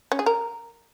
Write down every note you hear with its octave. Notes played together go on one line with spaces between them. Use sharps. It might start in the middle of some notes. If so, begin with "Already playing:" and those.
C#4
G#4
A#4